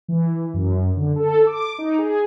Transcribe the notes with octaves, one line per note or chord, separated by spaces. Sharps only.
E3
F#2
D3
A4
D6
D#4
G#4